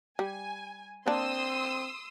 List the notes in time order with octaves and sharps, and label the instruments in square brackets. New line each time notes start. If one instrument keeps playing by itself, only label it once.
[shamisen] G3 [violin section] G#5
[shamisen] A#3 D4 [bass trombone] C4 [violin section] C6 D#6 E6